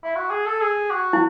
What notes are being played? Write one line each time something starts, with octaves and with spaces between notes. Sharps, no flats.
E4
F#4
G#4
A4
G#4
F#4
E4